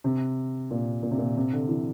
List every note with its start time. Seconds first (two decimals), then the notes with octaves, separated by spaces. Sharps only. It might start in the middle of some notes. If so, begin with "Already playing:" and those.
0.04 C3
0.71 A#2
1.03 A#2
1.11 C3
1.18 A#2
1.37 C3
1.53 D3
1.69 E3